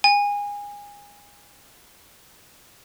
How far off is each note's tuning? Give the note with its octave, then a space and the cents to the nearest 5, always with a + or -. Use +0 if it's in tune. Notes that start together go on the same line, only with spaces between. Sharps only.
G#5 -25